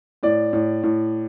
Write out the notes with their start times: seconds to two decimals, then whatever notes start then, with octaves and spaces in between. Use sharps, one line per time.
0.23 A2 D5
0.53 A2
0.83 A2